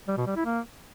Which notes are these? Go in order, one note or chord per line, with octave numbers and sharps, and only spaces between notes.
G3
B2
G3
E4
A#3